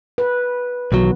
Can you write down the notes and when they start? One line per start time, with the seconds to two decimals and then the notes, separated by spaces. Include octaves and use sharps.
0.18 B4
0.92 B1 D#3 E3 F#3 B3